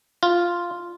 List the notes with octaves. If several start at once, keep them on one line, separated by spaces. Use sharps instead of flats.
F4